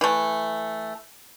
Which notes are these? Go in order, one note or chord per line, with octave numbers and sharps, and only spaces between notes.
E3 A3